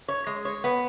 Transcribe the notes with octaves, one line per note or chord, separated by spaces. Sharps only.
C#5
G#3
C#5
B3